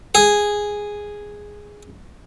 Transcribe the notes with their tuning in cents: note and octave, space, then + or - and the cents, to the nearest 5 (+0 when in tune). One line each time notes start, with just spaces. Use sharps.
G#4 -5